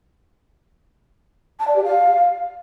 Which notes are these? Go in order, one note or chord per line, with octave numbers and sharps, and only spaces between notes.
A5
D5
G4
F5